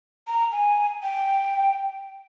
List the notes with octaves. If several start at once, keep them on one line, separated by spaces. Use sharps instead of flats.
A#5
G#5
G5